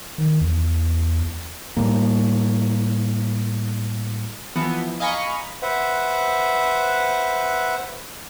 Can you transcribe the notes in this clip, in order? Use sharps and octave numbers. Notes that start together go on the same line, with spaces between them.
D#3
E2
A2 G3 A#3
E3 F3 B3
D#5 F5 G#5 A#5 B5 C#6
B4 C5 E5 F#5